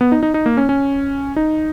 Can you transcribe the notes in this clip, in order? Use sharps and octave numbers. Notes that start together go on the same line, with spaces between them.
B3
D#4
D#4
D#4
A#3
C#4
C#4
D#4